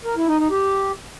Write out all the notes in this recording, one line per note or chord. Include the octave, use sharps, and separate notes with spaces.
A#4
E4
D#4
D#4
G4